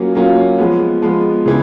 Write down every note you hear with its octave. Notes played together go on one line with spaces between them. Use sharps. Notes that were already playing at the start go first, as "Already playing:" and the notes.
Already playing: F#3 A#3 C#4 F4
F#3 A#3 C#4 F4
F3 G#3 B3
F3 G#3 B3
C#3 E3